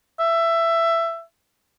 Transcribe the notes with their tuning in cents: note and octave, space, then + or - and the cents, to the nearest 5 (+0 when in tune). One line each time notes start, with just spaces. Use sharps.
E5 +15